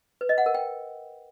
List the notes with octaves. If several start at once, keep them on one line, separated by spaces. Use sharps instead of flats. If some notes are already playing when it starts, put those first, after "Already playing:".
B4
D#5
F#5
A#4
G5